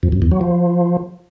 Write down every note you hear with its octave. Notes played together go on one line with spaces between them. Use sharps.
F2
F#2
E2
F#3
F3